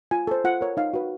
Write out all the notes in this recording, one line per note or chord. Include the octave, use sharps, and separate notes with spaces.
F4 G#5
A4 C5
F4 F#5
A#4 C#5
D#4 F5
F#4 B4